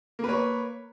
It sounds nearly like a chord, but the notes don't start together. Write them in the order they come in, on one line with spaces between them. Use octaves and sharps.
A#3 B4 C#5